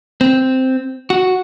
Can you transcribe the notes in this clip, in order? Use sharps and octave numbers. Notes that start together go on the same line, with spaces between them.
C4
F#4